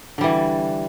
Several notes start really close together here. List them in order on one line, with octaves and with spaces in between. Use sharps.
D3 G3 E3